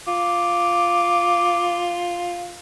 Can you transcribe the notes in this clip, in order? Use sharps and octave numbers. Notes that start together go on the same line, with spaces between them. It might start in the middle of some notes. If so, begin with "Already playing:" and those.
F4 D6